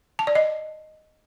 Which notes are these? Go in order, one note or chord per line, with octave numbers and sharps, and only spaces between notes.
A5
D5
D#5